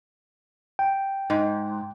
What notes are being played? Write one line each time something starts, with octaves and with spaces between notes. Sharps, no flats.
G5
G#2